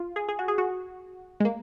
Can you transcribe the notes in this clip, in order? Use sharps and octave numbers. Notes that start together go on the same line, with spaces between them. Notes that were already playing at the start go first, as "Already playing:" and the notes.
Already playing: F4
G#4
G#4
F#4
G#4
F#4
G#3
A#3